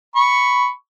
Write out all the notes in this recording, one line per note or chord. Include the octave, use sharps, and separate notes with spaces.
B5 C#6